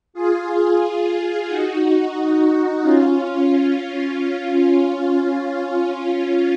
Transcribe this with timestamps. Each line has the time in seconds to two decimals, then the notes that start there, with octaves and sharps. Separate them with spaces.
0.14 F4 G#4
1.48 D#4 F#4
2.81 C#4 F4